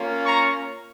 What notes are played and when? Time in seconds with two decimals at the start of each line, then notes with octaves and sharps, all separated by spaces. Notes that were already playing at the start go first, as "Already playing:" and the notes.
Already playing: A#3 C#4 F4
0.26 A#5 C#6